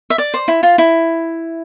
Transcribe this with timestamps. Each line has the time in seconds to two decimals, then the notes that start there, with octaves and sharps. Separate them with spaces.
0.10 E5
0.18 D5
0.34 C5
0.48 E4
0.63 F4
0.78 E4